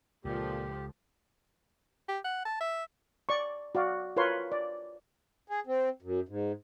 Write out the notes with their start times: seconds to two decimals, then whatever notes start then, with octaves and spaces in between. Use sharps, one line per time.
0.25 C#2 A#2 D3 F3 G4
2.08 G4
2.24 F#5
2.45 A5
2.60 E5
3.29 D5 C#6
3.75 F#4 D5 F5
4.16 F4 A#4 B4 C#5 C6
4.52 D5
5.48 G#4
5.67 C4
6.02 F#2
6.28 G#2